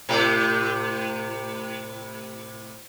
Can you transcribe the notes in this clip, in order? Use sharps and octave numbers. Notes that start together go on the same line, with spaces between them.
A2 C3 G4